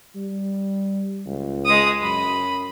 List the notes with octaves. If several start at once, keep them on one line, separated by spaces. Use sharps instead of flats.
G3
C#2
G#3 D#6
F#2 B5